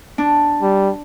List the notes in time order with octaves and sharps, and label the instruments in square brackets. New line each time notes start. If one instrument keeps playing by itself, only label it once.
[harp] D4
[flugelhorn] G3